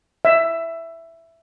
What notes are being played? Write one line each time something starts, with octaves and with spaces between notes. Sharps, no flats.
E5